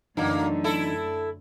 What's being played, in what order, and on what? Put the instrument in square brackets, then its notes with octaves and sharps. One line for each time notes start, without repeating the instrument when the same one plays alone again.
[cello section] F#2 D3 A3 [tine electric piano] E3 D4 D#4 [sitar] F#3 A#3
[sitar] E4 A4